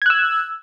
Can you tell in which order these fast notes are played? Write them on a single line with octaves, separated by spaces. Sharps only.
G#6 F#6 E6